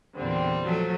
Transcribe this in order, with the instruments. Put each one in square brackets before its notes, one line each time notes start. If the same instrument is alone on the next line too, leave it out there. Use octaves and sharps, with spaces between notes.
[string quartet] E2 A#2 D3 [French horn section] G3 C4
[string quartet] F3 F#3 A3